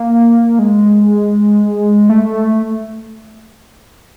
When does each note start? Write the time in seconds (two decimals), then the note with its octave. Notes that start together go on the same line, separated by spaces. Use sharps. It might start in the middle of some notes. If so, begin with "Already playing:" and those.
Already playing: A#3
0.59 G#3
2.10 A3